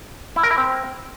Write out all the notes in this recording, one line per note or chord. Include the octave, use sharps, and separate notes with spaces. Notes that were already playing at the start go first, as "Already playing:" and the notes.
E4
A#4
E4
C4